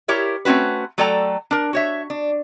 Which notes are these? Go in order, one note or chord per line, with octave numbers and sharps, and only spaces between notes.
E4 G4 A#4 C#5 E5
A3 C4 C#4 F#4 B4
F#3 A3 A4 D5 G5 A#5
D4 A#4
F#4 C#5 E5
D4